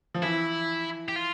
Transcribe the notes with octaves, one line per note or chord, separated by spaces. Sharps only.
F3
E3 E4
G4
F4